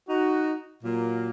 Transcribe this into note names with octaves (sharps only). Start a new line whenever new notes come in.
D#4 F#4
A#2 F#3 A#3